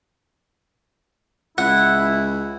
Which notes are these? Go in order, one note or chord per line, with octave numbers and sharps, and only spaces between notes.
C#2 E4 F#5